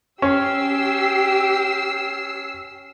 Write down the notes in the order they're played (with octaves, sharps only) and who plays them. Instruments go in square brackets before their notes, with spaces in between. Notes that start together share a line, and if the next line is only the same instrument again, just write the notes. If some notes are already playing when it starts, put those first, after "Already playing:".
[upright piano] C#4 [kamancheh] G4 [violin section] E6 C7